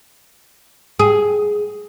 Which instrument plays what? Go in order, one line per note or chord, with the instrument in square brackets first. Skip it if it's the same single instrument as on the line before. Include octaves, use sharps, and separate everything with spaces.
[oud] G#4